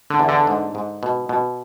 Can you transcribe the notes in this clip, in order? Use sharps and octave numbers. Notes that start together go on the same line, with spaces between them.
D3
E2
D3
G#2
G#2
B2
B2